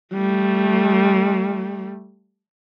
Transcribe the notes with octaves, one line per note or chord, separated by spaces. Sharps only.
G3 A3